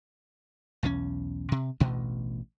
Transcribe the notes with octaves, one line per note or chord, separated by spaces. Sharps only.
B1 E2 E3 C#4
C3
A1 D2 B2